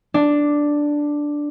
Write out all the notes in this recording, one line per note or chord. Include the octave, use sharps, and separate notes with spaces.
D4